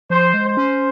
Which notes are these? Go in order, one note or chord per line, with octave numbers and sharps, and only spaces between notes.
F3 C5
G#3
C5
C#4